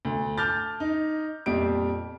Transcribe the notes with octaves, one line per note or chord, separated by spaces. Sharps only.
D2
A5 D6 F6 G6 A6
D#4
F2 A#2 G3 D7